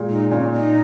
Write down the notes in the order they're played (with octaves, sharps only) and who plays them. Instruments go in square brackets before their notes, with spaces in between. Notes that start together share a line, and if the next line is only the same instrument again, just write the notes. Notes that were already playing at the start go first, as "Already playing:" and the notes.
Already playing: [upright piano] A#2 G#3
[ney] D#4
[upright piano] A#2 [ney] C#4
[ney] D#4